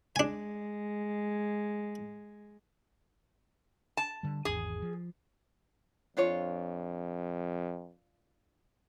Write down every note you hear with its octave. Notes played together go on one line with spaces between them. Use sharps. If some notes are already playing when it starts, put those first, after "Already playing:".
G#3 D4 G#5
A5
D3 G3
G#1 E2 G#4
F3
F2 D4 F4 C#5